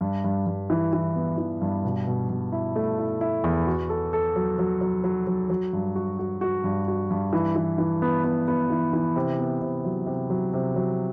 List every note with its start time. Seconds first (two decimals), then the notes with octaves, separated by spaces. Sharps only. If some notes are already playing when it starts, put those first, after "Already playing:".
0.01 G2
0.24 G2
0.46 G2
0.70 E3
0.93 E3
1.16 B3
1.38 E3
1.61 G2
1.84 B2
2.07 B2
2.29 B2
2.52 E4
2.76 A3
2.99 E4
3.21 E4
3.44 E2
3.67 F#4
3.89 A4
4.13 A4
4.36 F#3
4.59 F#3
4.81 F#3
5.04 F#3
5.27 F#3
5.50 F#3
5.73 G2
5.96 F#4
6.19 F#4
6.41 F#4
6.64 G2
6.88 F#4
7.11 G2
7.33 E3
7.56 E3
7.78 E3
8.02 B3
8.24 B3
8.48 B3
8.70 E3
8.93 E3
9.16 C3
9.39 B3
9.62 C3
9.85 F#3
10.07 C3
10.30 F#3
10.53 C3
10.76 F#3